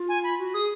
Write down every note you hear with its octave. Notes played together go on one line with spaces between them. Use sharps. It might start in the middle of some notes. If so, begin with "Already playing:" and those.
Already playing: F4
G#5
B5
F#4
G#4 D#6